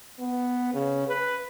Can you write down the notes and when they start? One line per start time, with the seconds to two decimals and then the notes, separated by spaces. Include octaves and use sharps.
0.20 B3
0.74 C#3
1.08 B4